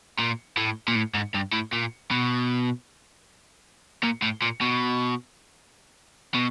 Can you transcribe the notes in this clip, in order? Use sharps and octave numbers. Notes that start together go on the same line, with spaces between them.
A#2
A2
A#2
A2
G#2
G2
A2
A#2
B2
A#2
A2
A#2
B2
B2